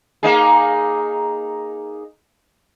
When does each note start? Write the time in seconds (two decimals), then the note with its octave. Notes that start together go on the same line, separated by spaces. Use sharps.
0.23 A#3 D#4 G#4